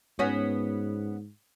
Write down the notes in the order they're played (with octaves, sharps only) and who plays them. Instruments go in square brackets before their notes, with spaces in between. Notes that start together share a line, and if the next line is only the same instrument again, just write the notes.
[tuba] G#2 [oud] B3 C#4 F#4